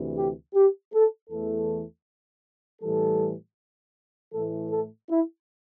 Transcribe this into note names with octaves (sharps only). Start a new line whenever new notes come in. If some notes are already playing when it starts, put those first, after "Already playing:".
Already playing: D2 C3 E3
G4
G4
A4
E2 E3 A3 A4
A2 E3 G3 A4
A2 E3 A3 A4
A4
E4